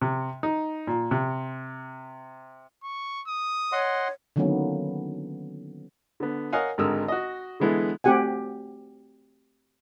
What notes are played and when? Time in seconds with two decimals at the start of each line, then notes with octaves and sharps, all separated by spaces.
0.01 C3
0.43 D#4
0.87 A#2
1.11 C3
2.84 C#6
3.28 D#6
3.72 C#5 D#5 F#5 C6
4.36 D3 D#3 F#3 A#3 B3 C#4
6.20 D3 B3
6.53 A#4 C#5 D#5 F5 F#5 G#5
6.78 G#1 D3 G#3 A#4 D#6 E6
7.08 F#4 D#5
7.60 D3 E3 G#3 B3 E4 A4
8.04 A3 C4 F#4 G4 F#5 G#5